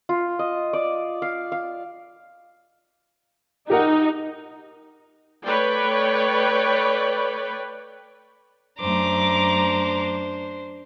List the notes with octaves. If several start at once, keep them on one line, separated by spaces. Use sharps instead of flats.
F4
D#5
D5
F5
F5
D#4 G4 A#4 F#5
A3 B4 C#5 D5 G5
F#2 A3 D4 C5 A#5 D6